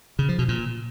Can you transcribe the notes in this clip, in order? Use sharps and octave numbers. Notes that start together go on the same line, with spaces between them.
C#3
F3
B2
A#2